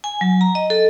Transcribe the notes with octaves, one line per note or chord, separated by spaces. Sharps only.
G#5
F#3
A#5
D#5
A4